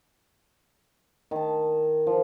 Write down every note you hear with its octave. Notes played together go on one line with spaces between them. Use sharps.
D#3 A5
F3